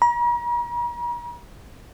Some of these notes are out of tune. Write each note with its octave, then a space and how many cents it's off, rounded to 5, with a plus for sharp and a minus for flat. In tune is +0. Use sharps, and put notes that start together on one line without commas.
A#5 +45